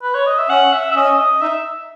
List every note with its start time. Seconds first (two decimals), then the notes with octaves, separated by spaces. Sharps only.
0.03 B4
0.15 C#5
0.27 D#5
0.38 E5
0.49 C#4 F#5
0.73 E5
0.92 E5
0.96 C#4 D#5
1.20 D#5
1.42 D#4 E5